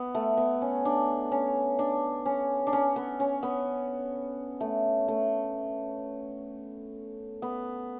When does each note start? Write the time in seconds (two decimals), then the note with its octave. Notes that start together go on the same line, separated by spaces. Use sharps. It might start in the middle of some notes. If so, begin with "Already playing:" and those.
Already playing: B3
0.15 A3
0.37 B3
0.62 C#4
0.85 D4
1.32 C#4
1.79 D4
2.26 C#4
2.67 D4
2.73 C#4
2.96 B3
3.20 C#4
3.43 B3
4.61 A3
5.08 A3
7.42 B3